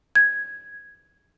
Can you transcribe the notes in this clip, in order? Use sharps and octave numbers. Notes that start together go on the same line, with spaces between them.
G#6